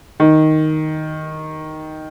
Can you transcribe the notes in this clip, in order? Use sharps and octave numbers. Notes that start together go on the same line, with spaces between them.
D#3